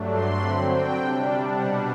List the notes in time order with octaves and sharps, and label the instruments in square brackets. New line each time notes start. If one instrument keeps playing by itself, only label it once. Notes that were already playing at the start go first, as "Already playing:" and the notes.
Already playing: [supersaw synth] G2 F#3 A3 D4
C6
D3 F#3 C4 B5
G5
C3 G3 D4
B2 G3 D4 F#5